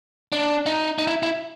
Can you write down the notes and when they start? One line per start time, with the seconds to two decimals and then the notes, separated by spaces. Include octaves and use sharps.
0.32 D4
0.66 D#4
0.99 D#4
1.07 E4
1.23 E4